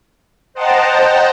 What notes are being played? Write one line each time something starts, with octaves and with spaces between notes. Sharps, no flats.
C5 D#5 F#5 G5 A5 A#5